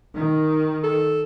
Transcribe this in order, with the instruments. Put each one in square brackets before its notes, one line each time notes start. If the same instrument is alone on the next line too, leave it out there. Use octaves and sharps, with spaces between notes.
[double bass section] D#3
[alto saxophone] A4